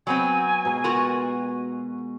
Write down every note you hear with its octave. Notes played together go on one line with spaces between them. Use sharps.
F#3 B3 C4 G#5
B2 G#3 A#5
F4 F#4 A#4